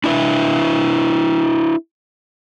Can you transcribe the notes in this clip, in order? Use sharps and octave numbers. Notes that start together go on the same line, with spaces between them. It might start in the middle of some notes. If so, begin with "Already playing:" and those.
D4 E4 B4 E5